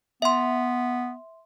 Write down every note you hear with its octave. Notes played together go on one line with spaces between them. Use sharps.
B3 E5 C6